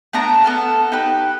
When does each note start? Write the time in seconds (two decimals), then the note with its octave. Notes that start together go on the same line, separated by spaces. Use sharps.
0.13 A3 B3 D4 A#5
0.44 B3 A4 F6
0.92 D#4 G4 B4